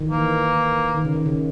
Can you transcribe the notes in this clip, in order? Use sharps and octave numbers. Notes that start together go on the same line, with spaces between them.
D#3
E3 A#3
D#3
C#3
D#3
C#3